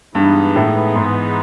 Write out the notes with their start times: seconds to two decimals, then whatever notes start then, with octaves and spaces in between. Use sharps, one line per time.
0.15 G2 E3 G#3 B3 D#4 G#4
0.55 A2
0.95 G#2